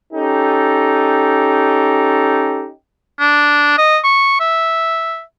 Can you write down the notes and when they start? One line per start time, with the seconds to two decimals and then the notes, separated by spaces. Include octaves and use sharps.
0.12 C#4 D#4 G4 A4
3.20 D4
3.78 D#5
4.04 C#6
4.40 E5